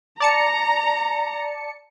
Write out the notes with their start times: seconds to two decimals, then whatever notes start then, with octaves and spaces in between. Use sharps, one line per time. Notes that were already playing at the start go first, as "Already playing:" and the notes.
0.20 D5 A5 A#5 C#7